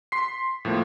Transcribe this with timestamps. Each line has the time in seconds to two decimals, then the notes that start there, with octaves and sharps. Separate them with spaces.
0.12 C6 B6 C7
0.65 A2 F3 A#3